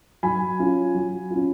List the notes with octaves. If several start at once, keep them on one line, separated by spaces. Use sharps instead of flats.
F#3 G#5 B5
C#4 F4
F#3
C#4 F4